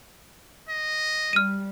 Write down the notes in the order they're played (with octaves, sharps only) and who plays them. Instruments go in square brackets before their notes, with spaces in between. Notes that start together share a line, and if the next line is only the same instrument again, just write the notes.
[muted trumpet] D#5
[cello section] G3 [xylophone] F6 D#7